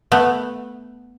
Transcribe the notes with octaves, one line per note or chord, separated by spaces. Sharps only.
A3 B3